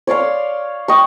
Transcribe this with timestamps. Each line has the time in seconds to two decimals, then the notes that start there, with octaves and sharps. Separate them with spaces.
0.07 C#5 D5 F5 C6
0.88 D#5 G5 C#6